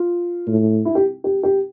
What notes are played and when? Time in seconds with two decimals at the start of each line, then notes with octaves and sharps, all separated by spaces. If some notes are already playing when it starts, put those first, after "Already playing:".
Already playing: F4
0.48 A2
0.85 E4
0.95 G4
1.24 G4
1.43 G4